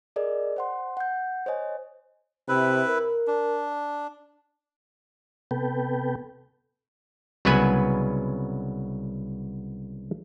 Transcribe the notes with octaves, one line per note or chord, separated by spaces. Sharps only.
G#4 A#4 D5 D#5
C5 F#5 C6
F#5 G6
C5 C#5 D#5 G#5
C3 E4 B4
A#4
D4
C3 B3 A4 B4 G5
C2 C#3 F#3 B3 B4 G#5